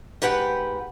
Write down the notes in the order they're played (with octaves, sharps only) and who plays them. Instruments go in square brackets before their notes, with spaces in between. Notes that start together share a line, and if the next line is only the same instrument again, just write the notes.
[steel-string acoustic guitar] G#2 G4 B4 F#5 G5